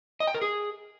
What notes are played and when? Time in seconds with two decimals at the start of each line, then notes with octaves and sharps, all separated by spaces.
0.20 D#5
0.27 G5
0.34 A#4
0.42 G#4